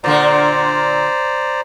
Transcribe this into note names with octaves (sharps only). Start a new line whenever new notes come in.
A#2 D3 A#3 C5 D5 A#5